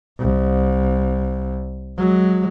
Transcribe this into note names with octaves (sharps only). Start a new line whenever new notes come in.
C2
F#3 G#3